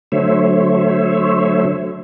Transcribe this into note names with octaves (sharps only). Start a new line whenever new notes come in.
D3 F#3 A3 C5 C#5 E5